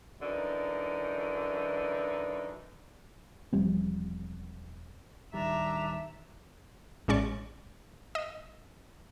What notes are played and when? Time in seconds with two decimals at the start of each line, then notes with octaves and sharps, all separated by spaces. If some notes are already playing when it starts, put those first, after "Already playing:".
0.21 F#2 D3 E3 D#4
3.53 E1 F3 G3 C4
5.34 D1 D#3 G3 D4 E5 A#5
7.08 A1 G#3 C#4 D5 C#6
8.15 D#5